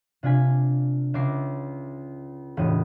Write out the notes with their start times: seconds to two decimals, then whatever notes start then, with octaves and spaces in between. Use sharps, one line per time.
0.23 C3 D4 F4 G#5 B6
1.14 C#2 E5 D6 A#6 C7
2.57 E1 A2 C#3 D#6